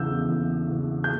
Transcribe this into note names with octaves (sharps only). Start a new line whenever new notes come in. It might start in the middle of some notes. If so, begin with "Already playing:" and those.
Already playing: E2 C#3 E3 E6 G6
E2
C#3 E3
G6